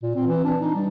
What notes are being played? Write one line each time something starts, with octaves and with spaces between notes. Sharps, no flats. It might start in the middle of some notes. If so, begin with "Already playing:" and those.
A#2
C4
E3
D4
D#4
G3